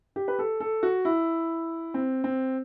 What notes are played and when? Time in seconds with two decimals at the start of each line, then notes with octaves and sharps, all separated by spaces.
0.16 G4
0.28 B4
0.39 A4
0.60 A4
0.83 F#4
1.05 E4
1.94 C4
2.24 C4